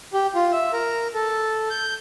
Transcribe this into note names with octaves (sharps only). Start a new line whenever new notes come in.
G4
F4
E5
A#4
A4
G6